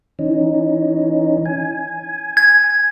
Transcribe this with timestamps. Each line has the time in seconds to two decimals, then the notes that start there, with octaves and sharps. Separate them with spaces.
0.19 E3 C#4 D#4
1.46 G#5
2.37 G#6